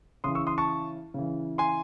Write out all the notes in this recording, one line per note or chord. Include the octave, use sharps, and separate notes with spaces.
C#3 E3 C6 D#6
C#6 E6
C6 D#6
A5 C#6
C#3 E3
G#5 C6